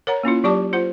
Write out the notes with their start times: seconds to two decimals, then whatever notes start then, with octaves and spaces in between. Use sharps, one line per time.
0.07 A#4 C#5 F#5 A#5
0.23 A#3 C#4 E4 F4
0.44 F#3 G4 D5 A5 D6
0.73 F4 C5 F#5